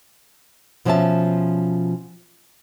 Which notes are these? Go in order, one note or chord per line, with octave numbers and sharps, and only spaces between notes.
B2 F3 C#4 D5 E5 A5